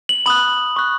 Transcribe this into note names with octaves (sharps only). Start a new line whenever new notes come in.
F#7
B5 D#6 F#6 F#7
C#6 F#6